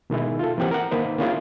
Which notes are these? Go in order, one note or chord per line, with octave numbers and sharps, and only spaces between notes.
B2 D#3 G#3 E4
F4 A4
E3 A#3 C4 G4 F#5
A#4 F#5
D#3 A#3 B4 C5
A#3 C4 C#4 E4 F4 G#4